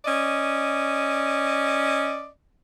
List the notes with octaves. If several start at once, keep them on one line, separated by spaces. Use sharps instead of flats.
C#4 D5 D#5